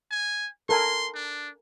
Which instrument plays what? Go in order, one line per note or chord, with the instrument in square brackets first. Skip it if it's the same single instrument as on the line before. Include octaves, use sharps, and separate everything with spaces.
[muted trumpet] G#5
[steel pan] A4 A#4 G#5 [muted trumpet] C6
[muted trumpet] D4